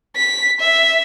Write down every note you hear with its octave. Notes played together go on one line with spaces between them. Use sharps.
B6
E5